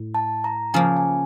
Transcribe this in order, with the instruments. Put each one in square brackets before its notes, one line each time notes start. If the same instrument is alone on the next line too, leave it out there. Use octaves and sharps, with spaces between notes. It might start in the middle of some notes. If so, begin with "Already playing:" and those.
Already playing: [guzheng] A2
[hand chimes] A5
A#5
[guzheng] C#3 F3 A#3 [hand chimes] G#5
[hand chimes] G#5